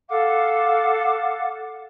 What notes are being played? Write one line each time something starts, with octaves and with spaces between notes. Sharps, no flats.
A4 F5 F#5 D6